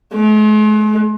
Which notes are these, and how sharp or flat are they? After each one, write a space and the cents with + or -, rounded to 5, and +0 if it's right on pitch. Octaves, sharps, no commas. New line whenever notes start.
G#3 +45